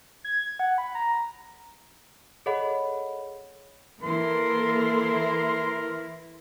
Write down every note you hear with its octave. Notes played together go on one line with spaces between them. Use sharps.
G#6
F#5
B5
A#5
G#4 A4 C#5 D#5 F#5 B5
E3 A#3 E4 A4 A#4 C6